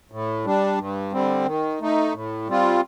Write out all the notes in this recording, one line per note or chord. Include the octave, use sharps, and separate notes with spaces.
A2
G3 D4
G2
D3 G3 C4
D#3
A3 D#4
A2
G3 C4 F4